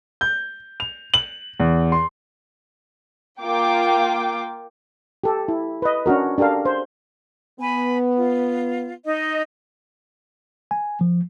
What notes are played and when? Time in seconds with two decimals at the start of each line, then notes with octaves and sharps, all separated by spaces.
0.21 G6
0.80 F7
1.14 F#7
1.60 E2
1.92 C6
3.42 A#3 F4 G5 D6
5.24 G4 A4
5.48 E4
5.82 B4 D#5
6.06 C#4 D4 F#4 A#4
6.38 D4 G4 A4 A#4 F5
6.65 C5
7.60 B3 G#5 B5
8.18 F4
9.04 D#4 D#5
10.71 G#5
11.01 F3